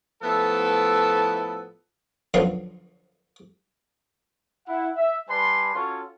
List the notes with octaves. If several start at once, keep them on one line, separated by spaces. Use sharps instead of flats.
A2 F3 B3 E4 A4
F#2 D3 F3 B3 F5 C6
E4 F#5
E5
G3 B4 D5 G#5 A5 C6
C#4 F4 F#4 A4 C#5